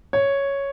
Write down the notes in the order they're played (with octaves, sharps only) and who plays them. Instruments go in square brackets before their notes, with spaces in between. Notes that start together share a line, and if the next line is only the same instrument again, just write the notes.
[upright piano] C#5